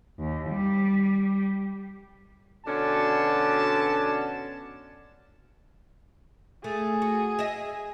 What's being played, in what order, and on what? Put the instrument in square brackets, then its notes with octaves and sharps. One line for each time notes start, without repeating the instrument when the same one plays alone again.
[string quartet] D#2
G3
[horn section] B2 D3 C#4 A5
[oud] A3 [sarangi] G#4
[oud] F#4
D#5 E5